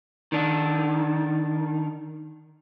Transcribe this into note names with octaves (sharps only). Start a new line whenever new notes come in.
D#3 D4